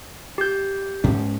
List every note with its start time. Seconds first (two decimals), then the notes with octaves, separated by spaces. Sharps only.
0.38 G4 G6
1.04 G#2 C#4